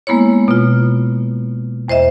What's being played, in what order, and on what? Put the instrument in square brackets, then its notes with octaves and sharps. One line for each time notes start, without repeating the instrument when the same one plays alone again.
[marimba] G#3 A#3 B3 E4 C#5
B2 F4
E2 C5 D#5 E5